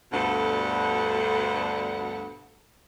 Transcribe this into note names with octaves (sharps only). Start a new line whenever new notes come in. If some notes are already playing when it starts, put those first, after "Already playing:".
D2 G2 B2 A4 F#5